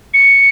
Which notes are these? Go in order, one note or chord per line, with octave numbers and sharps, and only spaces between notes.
C#7